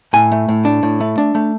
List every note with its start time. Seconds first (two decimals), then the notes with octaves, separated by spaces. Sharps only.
0.13 A2 G#5
0.32 A3
0.49 A2
0.65 D4
0.83 A2
1.00 A3
1.18 D4
1.35 A3